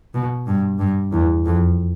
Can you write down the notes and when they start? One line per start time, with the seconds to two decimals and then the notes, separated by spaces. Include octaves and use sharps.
0.14 B2
0.47 G2
0.79 G2
1.12 E2
1.46 F2